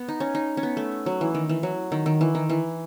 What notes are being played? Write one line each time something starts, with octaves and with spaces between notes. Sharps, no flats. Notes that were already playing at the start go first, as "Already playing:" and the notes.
Already playing: B3
D#4
C#4
D#4
C#4
B3
A3
F#3
E3
D#3
E3
F#3
D#3
D#3
E3
D#3
E3